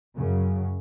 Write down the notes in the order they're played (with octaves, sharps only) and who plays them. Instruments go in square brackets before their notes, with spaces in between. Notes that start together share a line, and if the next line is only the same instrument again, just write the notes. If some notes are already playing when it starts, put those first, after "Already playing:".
[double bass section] F#2 C#3 F#3